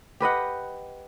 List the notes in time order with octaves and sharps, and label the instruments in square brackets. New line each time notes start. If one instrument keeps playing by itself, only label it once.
[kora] G4 B4 D#5 F#5